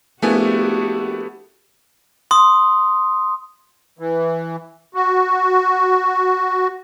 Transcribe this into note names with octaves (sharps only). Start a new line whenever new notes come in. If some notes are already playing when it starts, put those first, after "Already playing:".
A#1 A3 B3 E4 F#4 G4 G#5
C6 D#6
E3
F#4